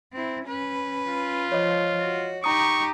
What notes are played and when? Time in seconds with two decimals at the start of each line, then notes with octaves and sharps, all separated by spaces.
0.13 C4 E4
0.46 C#4 B4
1.06 F4
1.52 F3 C#5 D#5
2.00 F#4
2.44 D#4 G4 A#5 C#6 D#6